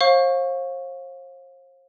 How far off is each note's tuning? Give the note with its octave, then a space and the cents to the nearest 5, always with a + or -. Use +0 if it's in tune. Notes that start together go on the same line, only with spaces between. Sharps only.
C5 +40 F5 +20 C#6 +0